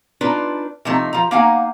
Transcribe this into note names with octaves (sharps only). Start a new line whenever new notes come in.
D4 D#4 F4 B4
C3 F3 A3 D#4
F3 A#5
A#3 D#4 F5 F#5 G#5